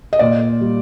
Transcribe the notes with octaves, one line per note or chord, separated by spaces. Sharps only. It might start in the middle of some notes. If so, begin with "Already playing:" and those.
D#5
A#2 D5
G3